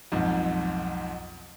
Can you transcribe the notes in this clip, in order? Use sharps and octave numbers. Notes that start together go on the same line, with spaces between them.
B1 F2 G#2